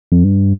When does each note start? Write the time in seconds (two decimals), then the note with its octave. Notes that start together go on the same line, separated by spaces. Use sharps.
0.12 F2
0.24 G2